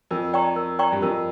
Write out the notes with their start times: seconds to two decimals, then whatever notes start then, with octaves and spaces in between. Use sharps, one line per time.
0.11 F2 A#4
0.33 D5 G5 A#5 C#6
0.56 A#4
0.79 D5 G5 A#5 C#6
0.92 G2
1.02 F2 A#4